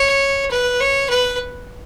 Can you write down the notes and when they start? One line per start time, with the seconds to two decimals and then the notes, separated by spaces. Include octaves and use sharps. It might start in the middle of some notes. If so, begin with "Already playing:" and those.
Already playing: C#5
0.51 B4
0.80 C#5
1.10 B4